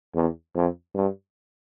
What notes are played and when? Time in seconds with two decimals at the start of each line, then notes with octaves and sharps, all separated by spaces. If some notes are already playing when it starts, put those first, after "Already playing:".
0.15 E2
0.55 F2
0.95 G2